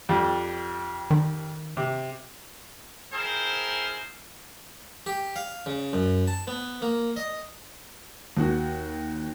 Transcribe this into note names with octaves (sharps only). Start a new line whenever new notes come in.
F2 G3
D#3
C3
C4 E4 G#4 A#4 C5
G4
F5
C#3
F#2
A5
B3
A#3
D#5
D#2 F#4